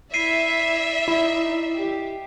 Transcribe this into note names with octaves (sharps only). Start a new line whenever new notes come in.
E4 D5 E5 B6 C7 D#7
D#4 E4
G4